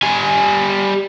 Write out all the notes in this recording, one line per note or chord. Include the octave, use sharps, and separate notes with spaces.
G3 G#5